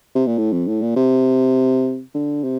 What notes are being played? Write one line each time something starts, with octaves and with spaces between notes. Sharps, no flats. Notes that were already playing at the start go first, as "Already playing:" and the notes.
C3
A#2
A2
F2
A2
A#2
C3
D3
C3